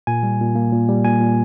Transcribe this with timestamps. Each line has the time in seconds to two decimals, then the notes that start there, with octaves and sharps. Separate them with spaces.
0.07 A#2 G#5
0.23 G3
0.40 A#2
0.55 A#3
0.73 A#2
0.89 G3
1.05 A#2 G#5
1.20 A#2